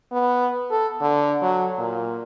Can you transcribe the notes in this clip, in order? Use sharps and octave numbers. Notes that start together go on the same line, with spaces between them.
B3
A4
D3
F#3
A#2